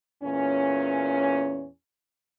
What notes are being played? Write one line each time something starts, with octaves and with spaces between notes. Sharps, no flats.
E2 A#2 C#4